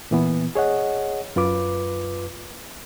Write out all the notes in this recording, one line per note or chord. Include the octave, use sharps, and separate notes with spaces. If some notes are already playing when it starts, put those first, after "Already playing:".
A#2 E3 B3
G#4 C#5 D#5 F#5
F#2 F4 B4 D6